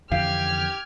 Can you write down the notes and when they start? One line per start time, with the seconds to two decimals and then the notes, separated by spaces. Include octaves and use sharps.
0.11 F2 D3 E3 G4 F5 F6 G#6